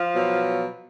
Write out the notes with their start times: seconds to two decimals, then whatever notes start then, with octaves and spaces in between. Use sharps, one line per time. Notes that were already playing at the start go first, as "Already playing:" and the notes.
Already playing: F3 F4
0.14 B2 F#3